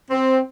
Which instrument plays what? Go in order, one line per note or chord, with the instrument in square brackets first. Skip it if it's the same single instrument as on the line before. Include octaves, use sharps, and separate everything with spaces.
[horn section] C4